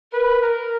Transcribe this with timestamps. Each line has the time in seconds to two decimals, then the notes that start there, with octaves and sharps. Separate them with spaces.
0.12 A#4 B4
0.42 A#4